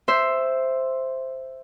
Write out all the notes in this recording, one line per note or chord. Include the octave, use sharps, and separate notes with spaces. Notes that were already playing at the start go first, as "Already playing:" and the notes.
C5 E5